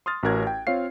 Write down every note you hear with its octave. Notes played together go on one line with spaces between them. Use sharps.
C6 D#6 F6 A6
A1 C#4 F#4 A#4 F#6 G#6
G5
C4 F4 C#5 F5 C7